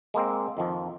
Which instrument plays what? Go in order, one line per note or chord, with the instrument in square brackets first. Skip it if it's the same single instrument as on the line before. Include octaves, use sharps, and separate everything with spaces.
[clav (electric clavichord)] G#3 A#3 C4
F2 D#3 F3